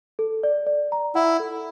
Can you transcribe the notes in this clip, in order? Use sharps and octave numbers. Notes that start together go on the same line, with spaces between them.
A4
D5
D5
A#5
E4 F#5
A4